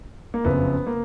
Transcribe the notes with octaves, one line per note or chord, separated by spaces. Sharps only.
A#3
F#1 F2 C#3 B3
A#3